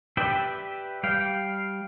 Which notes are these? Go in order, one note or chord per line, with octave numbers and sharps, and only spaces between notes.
G4 B4 D5 E5 G5
G3 D5 F5 G5